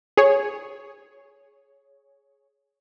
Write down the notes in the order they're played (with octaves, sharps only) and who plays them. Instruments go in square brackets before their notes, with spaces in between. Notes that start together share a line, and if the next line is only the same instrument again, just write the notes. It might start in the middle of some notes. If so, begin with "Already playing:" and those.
[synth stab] G#4 C#5